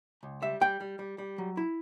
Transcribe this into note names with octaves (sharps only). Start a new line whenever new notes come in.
C#2
G3 E5
G3 G5
G3
G3
G3
F#3
E4